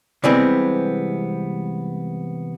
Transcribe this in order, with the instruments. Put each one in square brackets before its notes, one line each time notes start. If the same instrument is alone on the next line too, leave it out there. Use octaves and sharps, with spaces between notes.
[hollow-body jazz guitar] C3 E3 G3 G#3 B3 C4